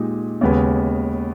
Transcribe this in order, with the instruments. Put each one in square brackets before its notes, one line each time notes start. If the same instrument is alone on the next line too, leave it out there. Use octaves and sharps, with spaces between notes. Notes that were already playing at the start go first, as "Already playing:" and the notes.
Already playing: [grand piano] A#2 G#3 D#4 G4
D#2 C#3 G#3 B3